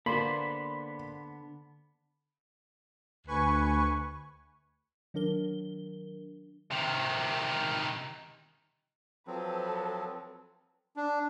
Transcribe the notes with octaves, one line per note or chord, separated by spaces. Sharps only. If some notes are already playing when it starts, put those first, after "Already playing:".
D3 A#3 B3 C5 D5 B5 C6
D2 B4 G#5 C#6
D#3 F#3 D4 A#4 G7
C3 D#3
F3 F#3 C4 A4 B4
D4